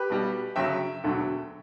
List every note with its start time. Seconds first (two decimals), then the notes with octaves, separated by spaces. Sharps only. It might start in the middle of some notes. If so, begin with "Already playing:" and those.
Already playing: G4 B4
0.10 B1 B2 G3
0.56 G1 F#2 C#3 F#3 E5 G5
1.03 E1 D2 D3 F#3